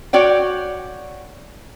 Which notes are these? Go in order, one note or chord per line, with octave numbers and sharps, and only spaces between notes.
F#4 C#5 D5 G5